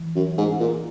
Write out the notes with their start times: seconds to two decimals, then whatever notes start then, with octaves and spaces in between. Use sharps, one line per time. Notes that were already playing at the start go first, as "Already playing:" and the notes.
Already playing: E3
0.16 F#2
0.37 G#2
0.60 A#2